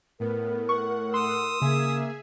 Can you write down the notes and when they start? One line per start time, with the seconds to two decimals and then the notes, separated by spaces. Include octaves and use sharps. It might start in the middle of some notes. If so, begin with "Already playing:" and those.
0.20 A2 B3 A#4
0.69 A2 F#5 C#6
1.14 C6 D#6 E6
1.62 C#3 A#3 G#4 E5 G#5